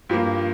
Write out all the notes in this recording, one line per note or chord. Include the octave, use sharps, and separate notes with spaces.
G2 F3 A#3